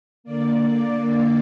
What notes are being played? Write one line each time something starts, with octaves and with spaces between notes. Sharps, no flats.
D3 A#3 D5
D5